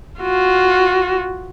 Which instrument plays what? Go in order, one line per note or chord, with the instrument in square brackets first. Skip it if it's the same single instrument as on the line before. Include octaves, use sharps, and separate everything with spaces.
[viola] F4 F#4